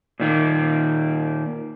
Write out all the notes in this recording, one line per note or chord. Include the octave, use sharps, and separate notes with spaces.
A#2 D#3 A#3